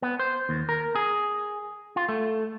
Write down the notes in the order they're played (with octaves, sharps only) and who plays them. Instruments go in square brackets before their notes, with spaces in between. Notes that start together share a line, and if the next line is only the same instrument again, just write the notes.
[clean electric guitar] B3
C5
D#2
A#4
G#4
F4
A3